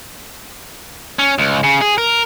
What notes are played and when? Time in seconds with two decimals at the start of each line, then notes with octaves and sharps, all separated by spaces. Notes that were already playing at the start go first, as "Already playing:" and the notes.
1.19 C#4
1.38 C#2
1.64 C#3
1.81 G#4
1.98 A#4